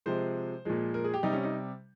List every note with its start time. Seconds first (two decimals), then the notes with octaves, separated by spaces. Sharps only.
0.06 C3 F3 G#3 C5
0.65 A#2 F3 G#3
0.94 A#4
1.04 G#4
1.14 G4
1.23 C3 G3 D#4
1.33 C#4
1.43 D#4